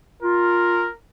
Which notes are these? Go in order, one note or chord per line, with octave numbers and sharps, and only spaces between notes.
F4 A#4